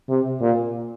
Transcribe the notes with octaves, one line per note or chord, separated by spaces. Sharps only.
C3
A#2